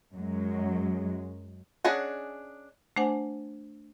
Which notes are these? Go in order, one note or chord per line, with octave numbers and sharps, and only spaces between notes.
F#2 F#3 G#3
C#4 D4 G#4 D#5 F#5
A3 D4 C5 F#5 G#5